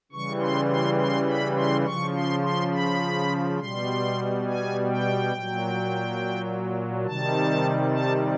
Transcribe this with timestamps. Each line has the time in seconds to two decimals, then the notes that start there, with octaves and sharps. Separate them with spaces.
0.12 C#3 E3 G3 C#6
0.40 C6
0.70 C6
0.99 C6
1.28 B5
1.56 C6
1.85 C#3 F3 C#6
2.15 C6
2.43 C6
2.73 B5
3.59 B2 G3 C6
4.46 G#5
4.89 G5
5.33 A#2 F#3
7.06 C3 D#3 G3 A5
7.93 A5